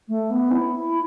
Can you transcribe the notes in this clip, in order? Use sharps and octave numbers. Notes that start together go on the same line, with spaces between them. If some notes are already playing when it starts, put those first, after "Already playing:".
A3
B3
E4